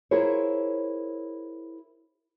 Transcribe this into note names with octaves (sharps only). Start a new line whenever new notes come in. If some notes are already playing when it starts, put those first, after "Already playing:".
E4 F4 G#4 A#4 C5 C#5